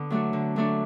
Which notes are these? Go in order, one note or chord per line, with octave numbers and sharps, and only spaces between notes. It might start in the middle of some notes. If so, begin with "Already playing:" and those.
Already playing: D3 B3
F#3 A3 D4 F#4
D3
F#3 A3 D4 F#4